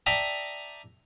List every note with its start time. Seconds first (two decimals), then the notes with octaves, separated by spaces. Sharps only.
0.06 D5 E5 G5 A5 A#5 D#6